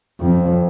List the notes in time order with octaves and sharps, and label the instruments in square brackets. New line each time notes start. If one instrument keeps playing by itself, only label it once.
[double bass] F2